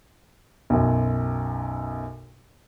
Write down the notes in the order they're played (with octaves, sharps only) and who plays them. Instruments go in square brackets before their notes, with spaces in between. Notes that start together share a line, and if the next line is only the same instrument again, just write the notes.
[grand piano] B1 F#2